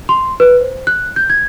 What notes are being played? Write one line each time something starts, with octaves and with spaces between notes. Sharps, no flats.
C6
B4
C5
F#6
G6
G#6